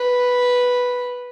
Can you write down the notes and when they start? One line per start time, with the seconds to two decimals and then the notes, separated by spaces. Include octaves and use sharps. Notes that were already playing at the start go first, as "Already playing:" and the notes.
Already playing: B4